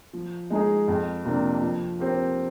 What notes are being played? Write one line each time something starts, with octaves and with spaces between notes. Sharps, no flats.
F3
G#3 D#4 G#4
F2
C3 F3 A#3 D4
F3
C4 G4 A#4